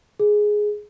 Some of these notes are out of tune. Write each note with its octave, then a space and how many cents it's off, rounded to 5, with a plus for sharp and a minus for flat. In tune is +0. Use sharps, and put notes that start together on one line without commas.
G#4 +5